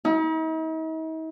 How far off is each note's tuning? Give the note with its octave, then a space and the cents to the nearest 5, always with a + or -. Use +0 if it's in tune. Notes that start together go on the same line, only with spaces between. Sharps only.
D#4 +45